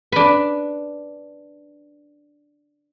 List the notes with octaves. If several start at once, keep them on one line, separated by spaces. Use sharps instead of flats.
D4 B4